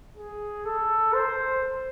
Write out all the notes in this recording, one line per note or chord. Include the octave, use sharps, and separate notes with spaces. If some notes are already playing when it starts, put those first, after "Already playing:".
G#4
A4
C5